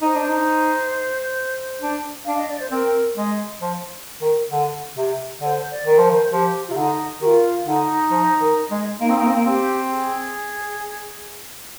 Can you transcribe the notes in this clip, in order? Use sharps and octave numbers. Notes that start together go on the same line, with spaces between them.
D#4 C5
D4
D#4
D4
D4 F5
D#5
D5
C5
C4 A#4
G#3
F3
D#3
D3
C3
D3 C5 D5
D5
D#3
F3 C5
D#3
F3 G4
C3 F4
D3 D#4
D#3 G4
F4
D3 D#4
F3
D#3
G#3
A#3 D#4
C4
A#3
C4
A#3
C4 G4
G#4